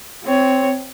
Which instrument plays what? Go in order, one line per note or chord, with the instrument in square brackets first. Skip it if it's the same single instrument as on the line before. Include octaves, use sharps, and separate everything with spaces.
[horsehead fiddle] C4 C#5